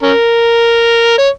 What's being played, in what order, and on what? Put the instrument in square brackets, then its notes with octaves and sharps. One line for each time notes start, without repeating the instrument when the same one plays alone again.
[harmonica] C#4 A#4
C#5